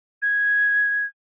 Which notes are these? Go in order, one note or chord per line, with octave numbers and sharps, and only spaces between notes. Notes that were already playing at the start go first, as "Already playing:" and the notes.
G#6